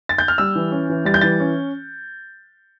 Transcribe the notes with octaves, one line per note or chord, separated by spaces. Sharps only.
A6
G6
F6
G3 E6
E3
C#4
E3
G3 A6
G6
E3 A6
C#4